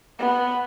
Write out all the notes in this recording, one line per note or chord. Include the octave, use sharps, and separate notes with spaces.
B3